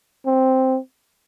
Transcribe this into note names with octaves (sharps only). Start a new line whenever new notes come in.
C4